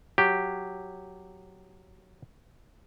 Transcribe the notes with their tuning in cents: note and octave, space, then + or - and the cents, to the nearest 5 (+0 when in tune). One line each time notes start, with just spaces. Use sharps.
F#3 +0 G4 +0